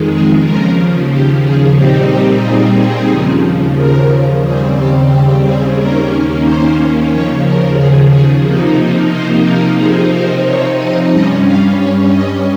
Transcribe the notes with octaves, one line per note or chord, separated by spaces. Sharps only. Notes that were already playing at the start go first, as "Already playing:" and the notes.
Already playing: F2 D#3 G#3
G#4
D#2 C#3 F3 A#4
G4
G#4
A#2 G3 C4 D#4 G4
G4
G#4
G#4
D#2 C#3 F3
A#4
D#2 C#3 G3 C4 G#4
G4
G4
G#4
D#2 D#3 A#3 C#4 A#4
C5
D#2 C#3 F3 C#5
A#4
G#4
G#4
C3 F3 A#3 D#4
C5
A#4
C3 F3 C4 D#4 G#4
A#4
C#5
D#5
G2 G3 C#4 D#5
F5
C#5
D#5